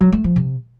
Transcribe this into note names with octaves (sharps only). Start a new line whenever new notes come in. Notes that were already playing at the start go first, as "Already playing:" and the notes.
F#3
A3
F3
C3